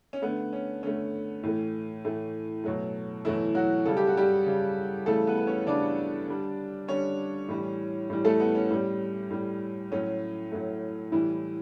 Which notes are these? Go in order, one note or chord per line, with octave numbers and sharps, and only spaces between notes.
C#4
D3 A3 B3
C#4
D3 A3 C#4
A2 E3 A3
A2 E3 A3
B2 F#3 A3
B2 E3 F#3 A3 E4
F#3 F#4
C#3 G3 A4
G4
F#4
G3 G4
C#3 G3
C#3 E3 G3 A3 A4
B3 B4
B4
C#4 C#5
C#3 E3 G3 D4 D5
D3 G3
D3 G3 C#4 C#5
A2 E3 G3
A2 E3 G3
A3 A4
B3
C#4
A2 G3
A2 G3
A2 F#3 A3 C#4
A2 F#3 A3
A2 E3 G3 E4